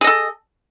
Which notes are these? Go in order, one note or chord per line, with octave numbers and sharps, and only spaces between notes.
G#4 A4 D#5